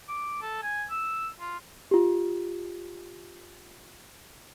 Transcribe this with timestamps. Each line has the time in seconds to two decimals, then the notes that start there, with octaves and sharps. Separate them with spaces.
0.08 D6
0.42 A4
0.63 G#5
0.90 E6
1.40 F4
1.91 F4 G4